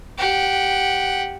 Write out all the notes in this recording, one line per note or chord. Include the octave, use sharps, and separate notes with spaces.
G4 F#5